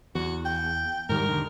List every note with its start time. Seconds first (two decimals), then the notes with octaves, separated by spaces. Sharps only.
0.15 E2 F#4
0.45 G5
1.09 G#2 D#3 G3 A#4
1.28 E1 D3 D#3